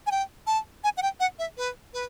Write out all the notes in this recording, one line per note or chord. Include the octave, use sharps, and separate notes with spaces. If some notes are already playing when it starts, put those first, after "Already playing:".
G#5
G5
A5
G#5
F#5
G5
F#5
E5
B4
B4